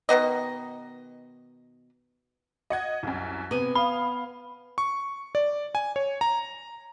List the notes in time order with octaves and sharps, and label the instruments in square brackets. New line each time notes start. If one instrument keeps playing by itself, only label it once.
[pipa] B2 D#3 B3 D#5
[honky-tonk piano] D#5 F#5 G#6
C2 F#2
[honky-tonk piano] C3 [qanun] B3 G#5
[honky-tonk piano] F5 [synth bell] B5
[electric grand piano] C#6
D5
G#5
C#5
A#5